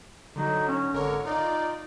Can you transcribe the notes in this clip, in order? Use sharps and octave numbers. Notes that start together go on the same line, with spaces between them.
D3 F#3 D#4 F#4
C#4
G#1 D3 A#4 C#5
D#4 F4 D5